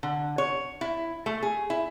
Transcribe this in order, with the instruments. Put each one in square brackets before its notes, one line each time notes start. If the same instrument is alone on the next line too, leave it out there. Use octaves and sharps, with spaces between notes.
[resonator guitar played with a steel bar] D3
C#5
E4
A3
G#4
E4